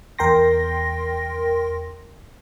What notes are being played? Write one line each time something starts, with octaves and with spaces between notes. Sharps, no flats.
E2 A#4 G5 C6 A#6